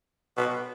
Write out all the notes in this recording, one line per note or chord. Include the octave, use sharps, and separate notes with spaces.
B2